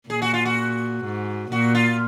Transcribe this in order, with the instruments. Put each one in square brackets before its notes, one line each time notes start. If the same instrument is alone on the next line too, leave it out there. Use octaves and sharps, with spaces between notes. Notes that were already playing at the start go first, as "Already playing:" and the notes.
[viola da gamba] A#2 [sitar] G#4
[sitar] F#4
F4
F#4
[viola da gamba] G#2
[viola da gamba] A#2 [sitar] F#4
[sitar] F4